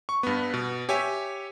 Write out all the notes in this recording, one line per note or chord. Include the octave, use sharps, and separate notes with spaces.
C#6
G2 B3
B2
G4 C#5 E5 G#5